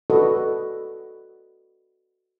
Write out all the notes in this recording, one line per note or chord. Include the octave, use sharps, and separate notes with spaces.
F#4 A4 B4 D5 D#5